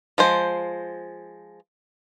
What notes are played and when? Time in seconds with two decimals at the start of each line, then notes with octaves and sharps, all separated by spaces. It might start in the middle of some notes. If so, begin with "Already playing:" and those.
0.18 F3 G#3 C5